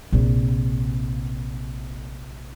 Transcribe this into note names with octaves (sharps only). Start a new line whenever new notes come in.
A#1 C3